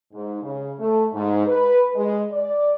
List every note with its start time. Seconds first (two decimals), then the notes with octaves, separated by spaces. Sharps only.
0.13 G#2
0.42 C#3
0.79 A3
1.13 G#2
1.47 B4
1.95 G#3
2.32 D5